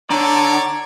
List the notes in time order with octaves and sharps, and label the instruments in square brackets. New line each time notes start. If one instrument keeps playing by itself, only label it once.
[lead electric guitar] D3 [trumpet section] C#5 D5 [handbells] A#5